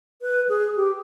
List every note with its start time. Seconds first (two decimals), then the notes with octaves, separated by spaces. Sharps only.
0.22 B4
0.49 G#4
0.76 G4